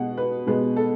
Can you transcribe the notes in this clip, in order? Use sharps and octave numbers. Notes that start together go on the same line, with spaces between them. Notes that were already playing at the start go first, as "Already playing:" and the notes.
Already playing: B2 G#3 B3 F#5
B4
B2 G#3 B3 B4
A4